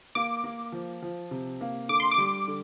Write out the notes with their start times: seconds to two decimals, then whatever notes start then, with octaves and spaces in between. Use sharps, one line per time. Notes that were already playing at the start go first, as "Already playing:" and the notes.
0.15 A#3 D6
0.44 A#3
0.72 F3
1.02 F3
1.31 C3
1.61 A#3
1.89 D3 D6
2.00 C6
2.11 D6
2.18 G3
2.48 D3